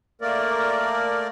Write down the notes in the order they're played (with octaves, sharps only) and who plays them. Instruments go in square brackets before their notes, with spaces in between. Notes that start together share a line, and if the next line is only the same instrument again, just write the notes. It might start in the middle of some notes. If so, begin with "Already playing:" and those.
[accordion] A3 A#3 A#4 D5